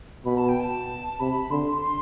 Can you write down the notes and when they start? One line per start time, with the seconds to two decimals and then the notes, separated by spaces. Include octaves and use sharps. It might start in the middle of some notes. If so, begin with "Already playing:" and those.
0.25 B2 B5
0.37 A5
0.49 G5
0.60 A5
1.20 C3 B5
1.50 D3 C6
1.82 C6